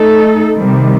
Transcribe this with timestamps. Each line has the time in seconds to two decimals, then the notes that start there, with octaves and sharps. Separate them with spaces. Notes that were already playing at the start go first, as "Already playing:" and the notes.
Already playing: A3 D#4 A4
0.54 C3 D#3 G3